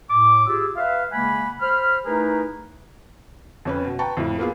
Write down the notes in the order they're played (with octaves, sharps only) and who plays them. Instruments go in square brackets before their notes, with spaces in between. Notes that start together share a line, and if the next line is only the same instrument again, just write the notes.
[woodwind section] A2 D6
F4 G4 G#4 D6 E6
B4 E5 F5
C#3 G#3 A#3 F#5 G#5 B5
C5 B5 F6
A3 D#4 E4 G#4 A#4 B4
[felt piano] F2 C#4 B4
B2
B4 G5 A5 A#5 C#6
F2 A2 E4
A#3 B3 F4 G#4